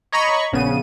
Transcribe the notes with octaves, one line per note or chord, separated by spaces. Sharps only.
C#5 D#5 A#5 B5 C#6
A#1 C#3 B3 D#7